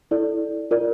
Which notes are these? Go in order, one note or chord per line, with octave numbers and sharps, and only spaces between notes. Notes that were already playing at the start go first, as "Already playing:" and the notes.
E4 A4 D5
F4 A#4 D5